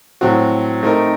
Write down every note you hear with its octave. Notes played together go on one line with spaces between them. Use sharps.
A2 F#3 C4 F#4
A3 C4 D#4 A#4